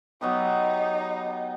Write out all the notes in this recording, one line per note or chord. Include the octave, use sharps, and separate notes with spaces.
F#3 B3 D#4 G4